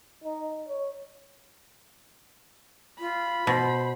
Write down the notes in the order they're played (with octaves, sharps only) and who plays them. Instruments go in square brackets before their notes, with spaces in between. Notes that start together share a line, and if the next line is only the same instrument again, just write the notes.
[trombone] D#4
C#5
[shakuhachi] F4 [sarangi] B5
[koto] B2 [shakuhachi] C5